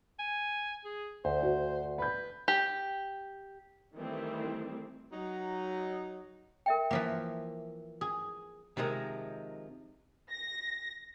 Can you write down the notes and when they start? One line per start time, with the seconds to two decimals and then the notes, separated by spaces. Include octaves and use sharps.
0.19 G#5
0.85 G#4
1.25 D2 C5
1.43 F#4
1.98 B4 B5 G6
2.48 G4
3.94 D#3 E3 G3 A3 C4 E4
5.13 F#3 D#4
6.66 A#4 E5 G5
6.91 E3 F3 A#3
8.01 G#4
8.77 C3 D#3 F3 G#3 A#4
10.30 A#6